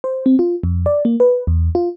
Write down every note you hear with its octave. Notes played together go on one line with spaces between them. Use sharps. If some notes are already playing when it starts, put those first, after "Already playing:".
C5
C4
F4
F2
D5
A#3
B4
E2
F4